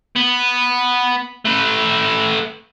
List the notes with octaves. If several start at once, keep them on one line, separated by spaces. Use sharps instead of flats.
B3
A3 B4